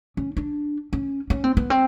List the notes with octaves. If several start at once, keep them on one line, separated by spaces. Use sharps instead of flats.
C#4
D4
C#4
C#4
C4
B3
C4